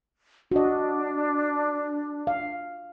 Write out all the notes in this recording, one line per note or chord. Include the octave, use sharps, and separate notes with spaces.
D4 F#4 D#5
F5